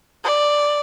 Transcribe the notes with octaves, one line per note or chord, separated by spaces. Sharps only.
D5